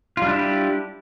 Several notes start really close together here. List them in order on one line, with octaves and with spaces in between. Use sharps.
F4 G3 D4 E4 G4